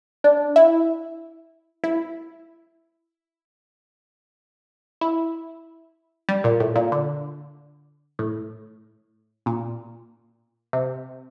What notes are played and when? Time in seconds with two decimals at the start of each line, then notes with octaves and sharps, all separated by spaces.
0.24 D4
0.56 E4
1.84 E4
5.01 E4
6.29 G3
6.44 A#2
6.60 A2
6.76 A#2
6.92 D3
8.19 A2
9.46 A#2
10.73 C3